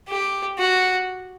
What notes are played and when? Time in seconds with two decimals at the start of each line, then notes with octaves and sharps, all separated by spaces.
0.09 G4
0.59 F#4